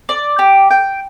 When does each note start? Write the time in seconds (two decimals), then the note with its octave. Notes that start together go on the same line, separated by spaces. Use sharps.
0.09 D5
0.39 G4
0.71 G5